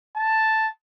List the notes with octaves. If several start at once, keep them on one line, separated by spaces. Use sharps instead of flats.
A5